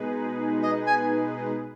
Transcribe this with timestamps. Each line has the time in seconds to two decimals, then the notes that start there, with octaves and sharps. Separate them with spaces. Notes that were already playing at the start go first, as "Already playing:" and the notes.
Already playing: B2 G#3 D#4 G#4 B4
0.63 D#5
0.87 G#5